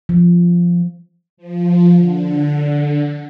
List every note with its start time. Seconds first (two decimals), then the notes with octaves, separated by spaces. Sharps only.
0.09 F3
1.37 F3
1.96 D3